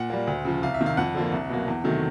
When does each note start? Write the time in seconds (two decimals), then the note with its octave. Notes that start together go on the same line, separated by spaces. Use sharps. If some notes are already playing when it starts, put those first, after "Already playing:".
Already playing: A#2 F#5
0.10 G3 A#3
0.27 D2
0.45 C#3 F3
0.63 C2 F5
0.74 E5
0.81 C3 D#3
0.86 F5
0.97 F2 F#5
1.14 D3 F3 A#3
1.32 C2
1.49 B2 F#3 A#3
1.68 E2
1.84 C3 D#3 F#3 A3